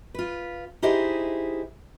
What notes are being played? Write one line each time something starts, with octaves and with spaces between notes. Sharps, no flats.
F4 B4
D#4 E4 G4 G#4 C5 D#5